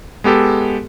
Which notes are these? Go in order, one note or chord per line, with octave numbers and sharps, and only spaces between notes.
G#3 B3 G4 A4